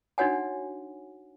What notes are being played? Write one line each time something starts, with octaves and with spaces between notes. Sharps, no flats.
D4 D#4 F#4 C#5 F#5 G#5